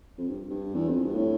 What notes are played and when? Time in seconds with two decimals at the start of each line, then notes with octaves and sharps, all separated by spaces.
0.18 F2
0.28 G2
0.50 G2
0.74 E2
0.88 F2
1.02 G2
1.15 A2